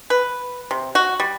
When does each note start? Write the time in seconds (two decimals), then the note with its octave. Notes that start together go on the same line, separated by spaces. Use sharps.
0.10 B4
0.71 C3
0.95 F#4
1.20 G3